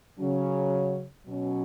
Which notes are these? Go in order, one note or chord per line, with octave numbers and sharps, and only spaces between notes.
C#3 F#3 C#4
B2 F#3 C#4